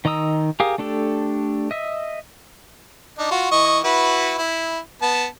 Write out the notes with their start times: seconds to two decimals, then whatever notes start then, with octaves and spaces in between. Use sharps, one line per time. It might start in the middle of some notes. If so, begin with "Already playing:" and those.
0.05 D#3 D#5 A#5 D#6 E6
0.60 G4 G#4 A#4 F5 D#6
0.78 A3 D4 G4 A4
1.71 D#5 E5
3.18 D4 D#4
3.31 F4 F#4
3.52 E3 D#5 C#6
3.84 E4 F#4 B4
4.38 E4
5.02 B3 A5